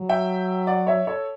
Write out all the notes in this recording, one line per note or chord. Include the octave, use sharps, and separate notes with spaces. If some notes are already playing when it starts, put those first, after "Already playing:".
Already playing: F#3
E5 G5
D5 F#5
C#5 E5
A4 C#5